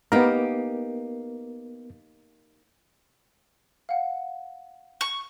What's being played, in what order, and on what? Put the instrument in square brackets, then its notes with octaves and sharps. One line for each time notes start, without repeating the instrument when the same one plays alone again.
[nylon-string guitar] A#3 D#4 G4 [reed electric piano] B3 A#4
[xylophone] F5 F#5
[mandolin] C#6